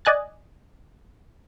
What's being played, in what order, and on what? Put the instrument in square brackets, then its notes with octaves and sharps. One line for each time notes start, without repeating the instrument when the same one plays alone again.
[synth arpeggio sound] D5 D#5 G#5 F#6 A6